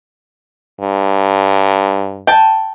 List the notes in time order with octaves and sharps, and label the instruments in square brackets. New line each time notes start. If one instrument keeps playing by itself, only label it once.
[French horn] G2
[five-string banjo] G5 A5